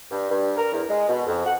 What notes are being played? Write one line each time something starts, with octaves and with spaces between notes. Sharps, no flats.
G2
G2
A#4
E2
G#3
B2
F2
F#5